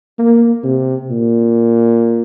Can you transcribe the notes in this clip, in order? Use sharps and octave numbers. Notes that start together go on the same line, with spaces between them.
A#3
C3
A#2